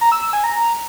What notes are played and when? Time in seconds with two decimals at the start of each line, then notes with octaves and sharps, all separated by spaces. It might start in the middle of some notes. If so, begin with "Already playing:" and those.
0.01 A#5
0.12 E6
0.22 E6
0.33 G#5
0.44 A#5